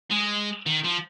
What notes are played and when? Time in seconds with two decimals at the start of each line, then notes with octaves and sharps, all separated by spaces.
0.11 G#3
0.66 D#3
0.84 F3